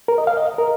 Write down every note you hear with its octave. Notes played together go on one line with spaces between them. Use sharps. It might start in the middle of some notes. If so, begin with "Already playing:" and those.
A#4
D#5
F5
D#5
A#4